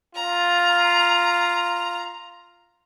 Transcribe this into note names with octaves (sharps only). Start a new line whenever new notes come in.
F4 A#5